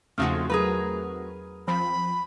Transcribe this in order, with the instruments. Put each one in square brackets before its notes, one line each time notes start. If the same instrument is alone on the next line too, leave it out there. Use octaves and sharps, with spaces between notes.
[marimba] E2 F6 [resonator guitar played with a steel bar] C#3 F3 G#3 [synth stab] A3 C4 F#4
[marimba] F#3 [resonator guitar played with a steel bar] G#4 A#4 B4
[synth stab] F3 C4 [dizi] B5